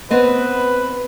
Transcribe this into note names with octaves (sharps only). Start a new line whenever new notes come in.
B3 C4 B4 D#5